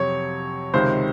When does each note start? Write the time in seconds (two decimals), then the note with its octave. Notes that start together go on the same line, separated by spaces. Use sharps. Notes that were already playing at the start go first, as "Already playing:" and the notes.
Already playing: F2 C3 F#3 C#5
0.74 C#2 C3 D#3 C5